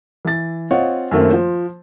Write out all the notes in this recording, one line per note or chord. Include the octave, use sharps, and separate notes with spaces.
E3 A6
C4 F4 C#5 D#5 F#5
F#2 D#3 A3 A#3 C4
F3 C5